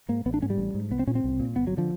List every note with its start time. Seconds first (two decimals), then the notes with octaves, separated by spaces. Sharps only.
0.09 G#2 A#3
0.26 A1 B3
0.34 D4
0.42 G#2 C#4
0.50 G3
0.58 A1
0.74 G#2
0.91 C2 B3
0.99 C4
1.07 A#2 C#4
1.15 C4
1.24 C2
1.40 A#2
1.56 G1 B3
1.67 F#3
1.77 D3 F3